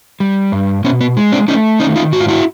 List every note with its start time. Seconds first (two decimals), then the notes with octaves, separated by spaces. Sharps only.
0.20 G3
0.52 G2
0.84 B2 B3 C#4
1.01 B3
1.17 G#3
1.32 C4 D4
1.48 A3 C#4 D#4
1.80 D#3 C#4 D#4
1.96 D#4 F4
2.13 G#2 F#4
2.20 F4
2.28 E4 F#4